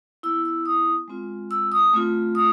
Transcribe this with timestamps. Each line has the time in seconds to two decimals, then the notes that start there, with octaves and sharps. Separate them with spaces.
0.23 B3 E4 E6
0.45 E6
0.66 D#6
1.08 G#3 C4 F4
1.51 E6
1.72 D#6
1.93 A3 C4 F4
2.35 D#6